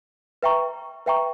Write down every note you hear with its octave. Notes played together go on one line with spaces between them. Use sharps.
B4 E5 G5 A#5 C#6
B4 E5 G5 A#5 C#6